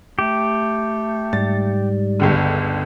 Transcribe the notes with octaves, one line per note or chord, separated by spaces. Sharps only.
A3 G4
G#2 G3 A6
G1 C#2 D3